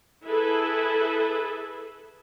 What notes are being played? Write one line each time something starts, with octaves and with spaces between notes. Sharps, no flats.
E4 G#4 A4 B4 E5